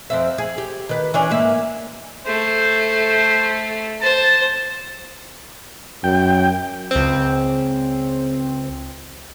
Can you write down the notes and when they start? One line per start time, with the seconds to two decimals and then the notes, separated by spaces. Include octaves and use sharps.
0.10 F2 C4 E5
0.38 G#4
0.58 G4
0.89 D#3 B4
1.14 E3 C#4 D4
1.30 G#2 A#3 E5
2.27 A3 C5
4.02 C5 A5
6.04 F#2 G5
6.91 C#2 C4